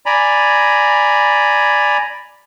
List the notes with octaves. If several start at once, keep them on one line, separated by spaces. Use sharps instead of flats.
D5 G#5 A#5 B5